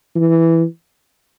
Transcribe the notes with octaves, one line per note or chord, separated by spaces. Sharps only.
E3